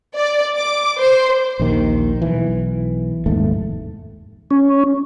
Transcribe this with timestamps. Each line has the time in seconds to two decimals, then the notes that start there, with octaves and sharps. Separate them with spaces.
0.15 D5
0.56 D6
0.98 C5
1.60 A#1 D#2 D#3
2.22 B1 E3
3.26 F1 D#2 G#2 A3
4.51 C#4